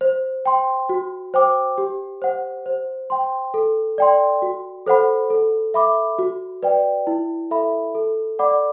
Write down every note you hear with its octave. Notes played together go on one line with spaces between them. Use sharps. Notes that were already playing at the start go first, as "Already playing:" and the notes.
C5
G5 C6
F#4
C5 G5 D6
G4
C5 F#5
C5
G5 C6
A4
D5 G5 C6
F#4
A4 C5 F#5 B5
A4
E5 B5 D6
F#4
B4 D5 G5
E4
A4 E5 B5
A4
D5 F#5 B5 D6